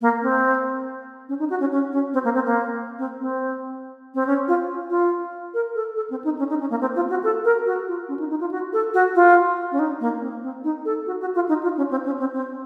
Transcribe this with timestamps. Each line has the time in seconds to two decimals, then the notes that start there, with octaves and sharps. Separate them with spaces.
0.01 A#3
0.22 C4
1.29 C#4
1.39 D#4
1.50 F#4
1.60 C#4
1.72 C#4
1.92 C#4
2.14 C4
2.24 A#3
2.35 C4
2.46 A#3
2.99 C4
3.20 C4
4.14 C4
4.27 C#4
4.48 F4
4.90 F4
5.54 A#4
5.75 A4
5.96 A4
6.10 C4
6.24 D#4
6.39 C#4
6.49 D#4
6.60 C#4
6.70 A#3
6.81 C4
6.96 F4
7.10 F#4
7.23 A4
7.45 A#4
7.66 F#4
7.87 F4
8.09 C#4
8.20 D#4
8.30 D#4
8.41 F4
8.51 F#4
8.73 A4
8.94 F#4
9.15 F4
9.72 C#4
9.79 D#4
10.01 A#3
10.21 C4
10.42 C4
10.64 D#4
10.85 A4
11.07 F#4
11.21 F#4
11.35 F4
11.49 D#4
11.63 F4
11.77 C#4
11.91 C4
12.06 C#4
12.20 C4
12.34 C4